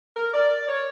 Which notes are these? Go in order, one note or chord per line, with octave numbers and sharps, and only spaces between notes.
A#4
D5
C#5